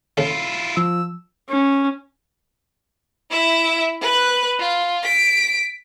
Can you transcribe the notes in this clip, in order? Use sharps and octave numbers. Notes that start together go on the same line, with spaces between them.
C#3 A3 E4 F4
F3 E6
C#4
E4 E5
B4 F#6
F4
B6 D7